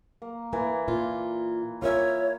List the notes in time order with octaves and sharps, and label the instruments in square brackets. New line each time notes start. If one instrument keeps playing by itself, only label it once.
[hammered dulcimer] A#3
[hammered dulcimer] E3 [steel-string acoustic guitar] A#3
[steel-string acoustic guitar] A#2 F4
[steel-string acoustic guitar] F4 A#4 E5 [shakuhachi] C#5